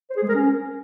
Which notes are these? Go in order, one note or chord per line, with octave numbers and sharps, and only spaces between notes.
C5
G#4
G#3
A#4
C#4